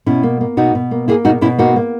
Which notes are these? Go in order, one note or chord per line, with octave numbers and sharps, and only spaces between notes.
B2 C#4 E4
A#3
A#3
B2 D#4 F#4
B2
A#3
A#3 E4 G#4
B2 D#4 F#4
B2 C#4 E4
A#3 D#4 F#4
A#3